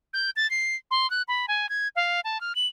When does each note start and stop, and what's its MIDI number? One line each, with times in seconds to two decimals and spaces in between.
0.14 0.30 91
0.36 0.49 93
0.50 0.76 96
0.91 1.09 84
1.10 1.22 90
1.28 1.46 83
1.48 1.69 80
1.69 1.88 92
1.96 2.20 77
2.24 2.40 81
2.41 2.55 89
2.55 2.67 102